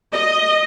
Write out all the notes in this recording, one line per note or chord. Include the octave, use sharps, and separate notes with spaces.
D#5